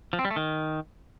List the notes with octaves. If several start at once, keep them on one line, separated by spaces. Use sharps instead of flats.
F3
C4
G3
A3
D#3